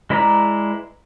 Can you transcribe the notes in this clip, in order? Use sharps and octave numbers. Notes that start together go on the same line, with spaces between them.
G#3 E4 B4 D5 A#5